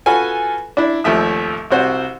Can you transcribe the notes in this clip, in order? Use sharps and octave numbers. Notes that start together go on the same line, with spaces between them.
F4 F#4 A4 B4 G#5
D4 E4
G#1 D#2 F3 A3 E5 D#6
C2 C3 F#4 C5